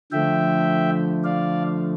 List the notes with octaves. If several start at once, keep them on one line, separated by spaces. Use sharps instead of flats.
D3 F3 A3 E5 G5
D5 F5